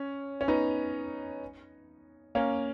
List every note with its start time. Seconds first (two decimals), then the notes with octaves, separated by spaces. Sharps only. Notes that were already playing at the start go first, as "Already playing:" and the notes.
Already playing: C#4
0.41 C#4
0.48 B3 D#4
2.35 A#3 C#4